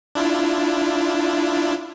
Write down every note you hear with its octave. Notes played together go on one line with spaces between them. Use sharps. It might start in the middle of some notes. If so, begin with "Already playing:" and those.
D4 E4 F4